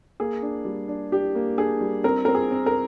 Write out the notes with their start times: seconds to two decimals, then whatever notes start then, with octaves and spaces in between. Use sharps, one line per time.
0.20 A#3 G#4
0.42 D4
0.65 G3
0.88 D4
1.12 D4 G4
1.35 A#3
1.58 D4 G#4
1.81 G3
2.04 C4 A#4
2.25 C4 A#4
2.35 G#4
2.51 C4
2.66 A#4